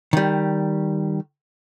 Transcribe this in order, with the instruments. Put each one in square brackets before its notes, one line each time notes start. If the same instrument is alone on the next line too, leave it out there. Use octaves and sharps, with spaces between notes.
[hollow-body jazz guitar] D#3 G3